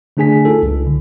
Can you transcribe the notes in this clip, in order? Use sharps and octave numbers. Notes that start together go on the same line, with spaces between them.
D3 A3 D4 G#4 G#5 B6
D#4 F4 A4
C#2
D3